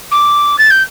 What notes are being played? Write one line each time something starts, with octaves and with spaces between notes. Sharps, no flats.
D6
A6
G6